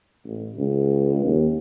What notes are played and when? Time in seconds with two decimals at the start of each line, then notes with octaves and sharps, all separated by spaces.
0.25 A1
0.57 C#2
1.25 D#2